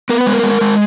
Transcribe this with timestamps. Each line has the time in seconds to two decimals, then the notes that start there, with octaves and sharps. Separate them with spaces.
0.09 B3 A#4
0.21 B4
0.27 G#3
0.33 A#4
0.43 G#3
0.61 G#3